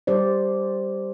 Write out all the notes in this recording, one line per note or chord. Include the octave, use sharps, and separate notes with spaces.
G3 G4 C5 D5